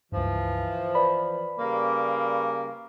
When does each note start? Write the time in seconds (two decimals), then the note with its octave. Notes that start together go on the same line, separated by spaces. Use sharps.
0.12 C#2 G2 E3 F3
0.95 B4 D5 B5
1.59 C#3 G3 A#3